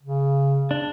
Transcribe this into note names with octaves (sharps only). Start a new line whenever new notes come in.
C#3
D4